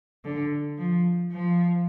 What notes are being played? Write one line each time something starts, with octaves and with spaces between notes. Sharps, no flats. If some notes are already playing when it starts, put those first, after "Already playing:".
D3
F3
F3